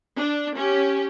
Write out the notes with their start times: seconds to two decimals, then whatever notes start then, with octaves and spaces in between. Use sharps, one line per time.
0.19 D4
0.57 C#4 G4